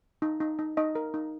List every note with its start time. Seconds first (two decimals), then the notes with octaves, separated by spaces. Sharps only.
0.22 D#4
0.40 D#4
0.59 D#4
0.77 D#4 D#5
0.95 A#4
1.14 D#4